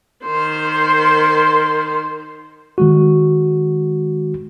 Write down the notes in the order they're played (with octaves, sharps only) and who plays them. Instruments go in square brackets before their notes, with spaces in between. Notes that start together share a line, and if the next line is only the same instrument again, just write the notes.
[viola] D#3 C5
[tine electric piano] D#3 G#3 F#4